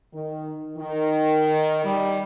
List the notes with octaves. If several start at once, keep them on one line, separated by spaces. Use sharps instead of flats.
D#3
D#3
G3